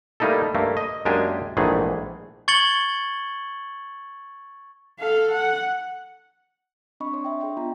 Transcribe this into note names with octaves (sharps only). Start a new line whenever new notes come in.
G3 A3 A#3 D#4 E4 A4
G2 A3 A#3
D#5
F#2 G#3 A#3 D4 G4 G#5
A#1 G#2 D#3 E3 A3 G#4
C#6 G#6 A6 C#7 F#7 G7
A4 F5
F#5
C4 D4 D#5 B5 C#6
D4 C#5 C6
E5 G5
D4 G#4 D#5 G5 C6
B3 D4 F4 A#5